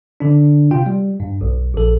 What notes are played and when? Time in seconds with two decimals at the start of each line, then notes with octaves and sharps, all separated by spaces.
0.20 D3 D4
0.71 C3 F4 G5
0.86 G3
1.20 G2
1.41 B1
1.74 A#1 A4